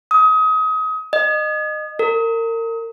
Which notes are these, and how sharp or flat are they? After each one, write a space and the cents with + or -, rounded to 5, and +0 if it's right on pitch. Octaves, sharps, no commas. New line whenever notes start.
D#6 +30
D#5 -25
A#4 -35